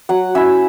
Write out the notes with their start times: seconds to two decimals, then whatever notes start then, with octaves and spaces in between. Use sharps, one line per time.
0.09 F#3 F#5
0.35 C#4 E4 E5